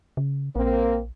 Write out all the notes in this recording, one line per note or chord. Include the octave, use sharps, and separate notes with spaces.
C#3
A#1 A#3 C4